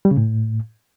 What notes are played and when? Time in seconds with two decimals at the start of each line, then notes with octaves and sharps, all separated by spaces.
0.05 G3
0.11 C#3
0.17 A2